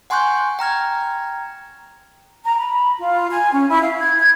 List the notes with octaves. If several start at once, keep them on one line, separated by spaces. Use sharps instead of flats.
F#5 G#5 C6 C#6 F#6 G6
G5 A#5 F6 G#6
A#5
B5
F4
G#5
C#4
E4
F5
G#6
G#6